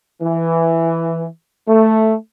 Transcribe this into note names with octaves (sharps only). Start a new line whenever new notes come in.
E3
A3